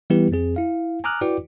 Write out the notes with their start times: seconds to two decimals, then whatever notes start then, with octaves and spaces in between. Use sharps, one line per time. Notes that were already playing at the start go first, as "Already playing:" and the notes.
0.10 E3 G3 B3 E4 G4 B4
0.32 F2 C4 G#4
0.56 E4 F5
1.04 G#5 A#5 D6 D#6 F6 F#6
1.21 E4 F#4 B4 D5 G5 D6